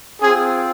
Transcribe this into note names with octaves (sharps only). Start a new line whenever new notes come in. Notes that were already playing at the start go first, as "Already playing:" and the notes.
C4 F4 G#4